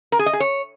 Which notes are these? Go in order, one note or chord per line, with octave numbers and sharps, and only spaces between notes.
A#4
G#4
D#5
G#4
C#5